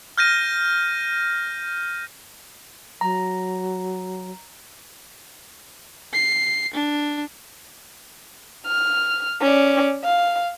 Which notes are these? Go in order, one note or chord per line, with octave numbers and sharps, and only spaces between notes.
F6 G6 A#6 D#7
F#3 A#5
C7
D4
F6
C#4 D5
F5